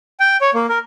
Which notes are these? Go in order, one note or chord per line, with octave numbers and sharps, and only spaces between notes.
G5
C#5
A#3
A#4